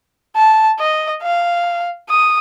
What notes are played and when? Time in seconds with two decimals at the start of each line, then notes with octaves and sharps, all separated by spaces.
0.36 A5
0.79 D#5
1.22 F5
2.09 D#6